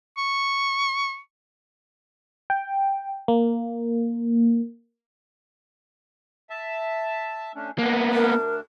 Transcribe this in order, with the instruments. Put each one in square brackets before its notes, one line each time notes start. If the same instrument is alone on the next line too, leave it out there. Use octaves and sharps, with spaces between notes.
[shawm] C#6
[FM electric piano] G5
A#3
[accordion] E5 A5
A3 C#4 D4
[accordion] D2 D4 [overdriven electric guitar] A#3 B3
[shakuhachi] A#4